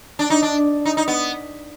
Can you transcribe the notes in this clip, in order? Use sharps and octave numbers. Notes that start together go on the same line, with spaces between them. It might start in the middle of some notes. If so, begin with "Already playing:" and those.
D4
D#4
D4
D#4
D#4
B3